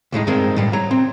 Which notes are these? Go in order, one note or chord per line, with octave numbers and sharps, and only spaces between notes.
C#2 A2 G#3 D#4
G2 D#3 G#3 C4 A#4
A2 G3 G#3
C#5 A#5
C4